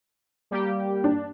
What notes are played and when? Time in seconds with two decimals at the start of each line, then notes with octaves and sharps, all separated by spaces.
0.51 G3 A#3 G4
1.04 D4